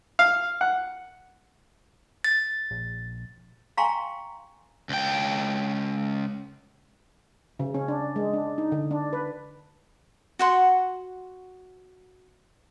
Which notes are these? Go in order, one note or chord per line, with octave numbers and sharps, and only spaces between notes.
F5
F#5
A6
A#1
F5 G5 G#5 A#5 C6 C#6
C#2 G5
C#3
C#4
D4
G#3
D4
D#4
D3
D4
B4
F#4 F#5 C6